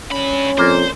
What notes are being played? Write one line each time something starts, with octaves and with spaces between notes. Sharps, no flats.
G2 C#4 B5
F2 A#3 C5 D5